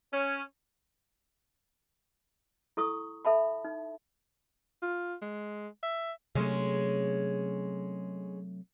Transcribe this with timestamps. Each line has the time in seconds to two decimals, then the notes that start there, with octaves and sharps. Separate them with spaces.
0.13 C#4
2.77 E4 A4 C#6 D#6
3.25 A4 E5 A5 B5
3.65 D#4
4.82 F4
5.22 G#3
5.83 E5
6.35 C3 F#3 G#3 A3 C#4